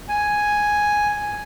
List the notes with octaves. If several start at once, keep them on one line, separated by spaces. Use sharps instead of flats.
G#5